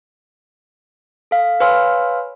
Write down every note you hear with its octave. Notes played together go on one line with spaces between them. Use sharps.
A4 F5
B4 C#5 F5 G#5 C6 E6